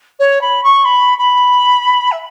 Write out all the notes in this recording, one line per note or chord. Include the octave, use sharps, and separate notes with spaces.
C#5
B5
C#6
B5
B5
E5